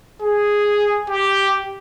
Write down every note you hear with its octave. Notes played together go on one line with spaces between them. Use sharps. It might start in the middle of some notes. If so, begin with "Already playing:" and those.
G#4
G4